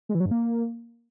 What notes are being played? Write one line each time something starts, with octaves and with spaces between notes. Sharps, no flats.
G#3
E3
F#3
G2
A#3